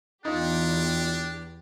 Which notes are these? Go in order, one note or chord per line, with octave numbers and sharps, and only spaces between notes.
E2 D4 D#4 F4 G4